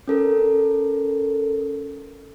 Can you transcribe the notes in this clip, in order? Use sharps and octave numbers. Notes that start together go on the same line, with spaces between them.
C#4 A4 A#4